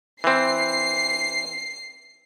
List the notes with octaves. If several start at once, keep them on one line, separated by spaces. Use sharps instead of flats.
E3 C4 C7